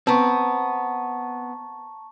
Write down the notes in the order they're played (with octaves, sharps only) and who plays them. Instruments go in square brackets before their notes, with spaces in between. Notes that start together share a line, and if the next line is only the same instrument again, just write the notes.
[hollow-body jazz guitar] B3 C4 [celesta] A5 A#5 C#6